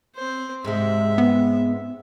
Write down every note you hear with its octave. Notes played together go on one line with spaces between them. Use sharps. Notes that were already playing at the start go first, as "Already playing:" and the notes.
C4 C5
G#2 C3 G#3 E5
B3